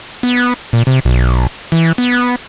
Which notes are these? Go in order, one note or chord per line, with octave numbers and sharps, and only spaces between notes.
B3
A#2
C3
B1
E3
B3